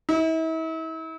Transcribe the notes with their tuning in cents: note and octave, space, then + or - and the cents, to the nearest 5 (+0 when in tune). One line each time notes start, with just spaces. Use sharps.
E4 -40